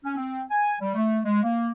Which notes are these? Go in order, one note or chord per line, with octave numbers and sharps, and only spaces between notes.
C#4
C4
G#5
G3
A3
G#3
A#3